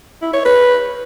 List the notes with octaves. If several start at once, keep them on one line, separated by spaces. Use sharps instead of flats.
E4
C#5
B4